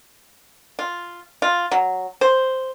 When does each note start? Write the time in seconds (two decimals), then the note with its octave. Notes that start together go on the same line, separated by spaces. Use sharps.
0.79 F4
1.42 F4
1.71 F#3
2.21 C5